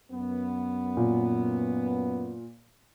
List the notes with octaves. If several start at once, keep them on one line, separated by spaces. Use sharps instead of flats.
F#2 B3
A#2